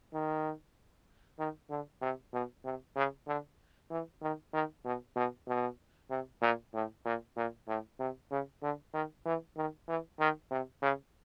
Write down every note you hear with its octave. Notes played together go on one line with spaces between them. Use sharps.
D#3
D#3
D3
C3
B2
C3
C#3
D3
E3
D#3
D#3
B2
B2
B2
C3
A#2
A2
A#2
A#2
A2
C3
C#3
D3
D#3
E3
D#3
E3
D#3
C3
C#3